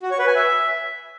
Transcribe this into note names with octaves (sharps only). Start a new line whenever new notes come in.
F#4
C#5
B4
G#5
E5